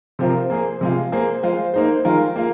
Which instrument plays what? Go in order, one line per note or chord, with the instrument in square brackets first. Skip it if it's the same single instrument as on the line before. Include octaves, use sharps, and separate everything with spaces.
[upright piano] C3 F3 C4 F4 A#4
A#3 G#4 C5
C3 G#3 F4
A#3 G#4 C5
G#3 F4 C5
A#3 D#4 C5
D#3 G#3 F4 A#4
A#3 F4